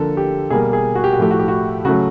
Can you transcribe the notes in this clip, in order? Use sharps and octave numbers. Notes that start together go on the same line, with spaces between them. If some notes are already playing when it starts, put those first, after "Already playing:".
Already playing: D3 F3 A#3 A4
G4
B2 G3 A#3 G#4
G#4
F#4
G4
F#4
A2 F3 A3 G4
F#4
G4
F#4
C#3 F#3 A3 F#4